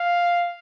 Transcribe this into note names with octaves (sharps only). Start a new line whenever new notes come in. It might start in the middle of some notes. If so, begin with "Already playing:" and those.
Already playing: F5